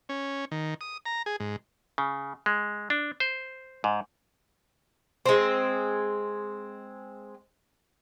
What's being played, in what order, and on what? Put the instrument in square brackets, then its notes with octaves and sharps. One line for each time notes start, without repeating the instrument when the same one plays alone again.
[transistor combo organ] C#4
D#3
D#6
A#5
G#4
G#2
[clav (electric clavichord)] C#3
G#3
D4
C5
G#2
[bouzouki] G#3 C4